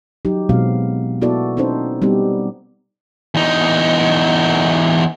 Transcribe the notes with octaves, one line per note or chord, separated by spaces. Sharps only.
F#3 D#4 G4
B2 F#3 G#3 B3 C4 F5
A#3 B3 E4 F#4 A4 D5
C4 C#4 D#4 A4 C5
G3 B3 C4 D#4 G4
E2 D#4